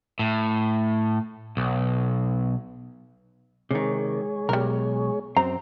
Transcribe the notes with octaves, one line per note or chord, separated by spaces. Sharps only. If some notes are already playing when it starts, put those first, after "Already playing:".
A2
B1
C3 D#3 G#3 G#4 C#5
B1 G3 A#4
F#2 C4 A#5